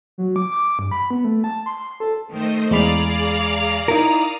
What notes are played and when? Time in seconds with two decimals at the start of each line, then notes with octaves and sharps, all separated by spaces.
0.18 F#3
0.36 D6
0.51 D6
0.79 G2
0.91 B5
1.11 B3
1.25 A3
1.44 A5
1.66 C6
2.00 A4
2.32 D#3 A3 C5 D#5
2.71 E2 G#3 G#4 D5 F5 A#5 B5
3.88 D#4 E4 A#4 D#6